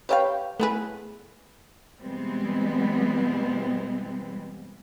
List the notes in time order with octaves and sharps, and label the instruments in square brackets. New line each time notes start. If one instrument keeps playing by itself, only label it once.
[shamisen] G4 E5 F5 [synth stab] B4 C#5 G5
[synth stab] A3 G#4 [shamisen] B3 E4 B4
[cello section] B2 E3 G3 G#3 B3 C4